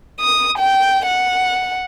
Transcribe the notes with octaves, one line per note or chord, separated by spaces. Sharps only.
D#6
G5
F#5